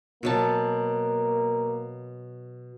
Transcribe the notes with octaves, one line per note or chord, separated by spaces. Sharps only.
B2 F#3 A#3 A5